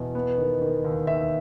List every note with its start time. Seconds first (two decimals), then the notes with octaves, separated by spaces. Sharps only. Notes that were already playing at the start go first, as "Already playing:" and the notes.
Already playing: E2 B2
0.15 B3
0.38 D#3
0.61 D#3
0.85 D#2
1.07 D#2 E5